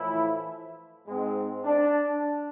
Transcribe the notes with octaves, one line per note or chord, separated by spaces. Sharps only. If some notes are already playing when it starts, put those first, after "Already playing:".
Already playing: A2 E3 F3 A3 E4
G#2 G#3 C4
D4